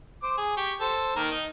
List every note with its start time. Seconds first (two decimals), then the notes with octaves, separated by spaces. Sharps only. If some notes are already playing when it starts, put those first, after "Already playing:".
0.23 C5 D6
0.38 G#4
0.57 G4 C#6
0.81 A4 C5
1.16 D#3 A#3 A#4
1.31 D#4